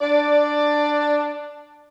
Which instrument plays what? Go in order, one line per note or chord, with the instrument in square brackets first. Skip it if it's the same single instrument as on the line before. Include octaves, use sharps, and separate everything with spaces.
[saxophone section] D4 D5